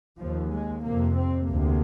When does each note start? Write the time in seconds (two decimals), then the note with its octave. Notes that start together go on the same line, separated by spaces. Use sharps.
0.19 D#2 F3
0.51 G#3
0.83 F2 C3 A#3
1.17 C4
1.49 D2 C3 A#3